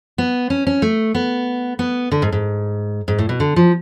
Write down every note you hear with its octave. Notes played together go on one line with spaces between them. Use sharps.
B3
C#4
C#4
A3
B3
B3
D3
G#2
G#2
G#2
A2
B2
D3
F3